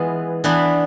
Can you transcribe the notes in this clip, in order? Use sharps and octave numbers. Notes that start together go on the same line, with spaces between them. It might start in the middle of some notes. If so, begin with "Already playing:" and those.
Already playing: E3 G#3 B3 F4
E3 B3 D4